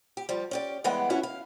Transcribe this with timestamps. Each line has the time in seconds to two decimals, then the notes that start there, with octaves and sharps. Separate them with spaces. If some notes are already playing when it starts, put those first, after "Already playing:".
0.17 G4
0.29 F3 G3
0.51 C#4 G4 D5
0.84 E3 G3 G#3 B3 F#5 G5
1.10 C#4 E4 F#4 C#5
1.23 F5